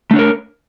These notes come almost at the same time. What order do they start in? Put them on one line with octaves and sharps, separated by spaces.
A3 D4 C#5 A#4